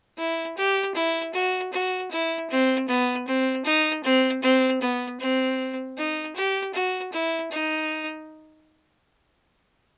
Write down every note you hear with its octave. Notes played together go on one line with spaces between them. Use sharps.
E4
G4
E4
F#4
F#4
E4
C4
B3
C4
D#4
C4
C4
B3
C4
D#4
G4
F#4
E4
D#4